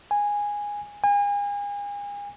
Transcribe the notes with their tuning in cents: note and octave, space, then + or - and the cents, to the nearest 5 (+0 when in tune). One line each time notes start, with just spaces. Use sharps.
G#5 -10
G#5 -35